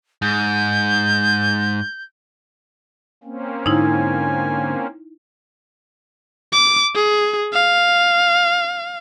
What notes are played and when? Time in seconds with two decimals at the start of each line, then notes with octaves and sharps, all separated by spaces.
0.22 G#2 G6
3.24 A#3 C4 C#4
3.66 G#2 D3 D#4 E4 G#5
6.53 D6
6.95 G#4
7.54 F5